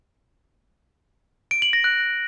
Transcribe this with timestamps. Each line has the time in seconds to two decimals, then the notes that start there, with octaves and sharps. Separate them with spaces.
1.51 D7
1.62 F#7
1.73 A#6
1.84 F#6